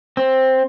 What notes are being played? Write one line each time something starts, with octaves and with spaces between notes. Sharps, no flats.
C4